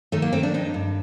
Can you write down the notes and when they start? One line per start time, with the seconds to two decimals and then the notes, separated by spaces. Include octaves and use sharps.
0.12 D#3 A3
0.22 A#3
0.33 D#3 C4
0.43 D4
0.54 G2 D#4
0.74 G2